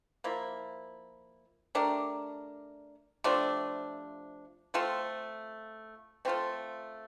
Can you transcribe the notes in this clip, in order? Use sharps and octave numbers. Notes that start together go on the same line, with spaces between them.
F3 A#3 E4
A3 D4 G4 A#4
C3 F3 A3 D4
A3 C4 F4 A4
A3 C4 F4 A4